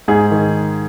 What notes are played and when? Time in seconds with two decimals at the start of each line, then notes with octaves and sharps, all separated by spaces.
0.08 G#2 G#4
0.31 D#3